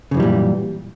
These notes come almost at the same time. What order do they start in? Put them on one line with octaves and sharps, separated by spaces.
C#3 F#2 E3 G3 A#2